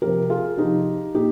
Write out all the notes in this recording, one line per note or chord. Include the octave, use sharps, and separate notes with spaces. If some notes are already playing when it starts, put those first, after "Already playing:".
C3 F3 G4 A#4
F4 G#4
C3 F3 D#4 G4
A#2 D#4 G4